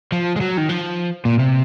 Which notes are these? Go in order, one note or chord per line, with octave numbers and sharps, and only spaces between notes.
F3
G#3
F#3
D#3
F3
A#2
C3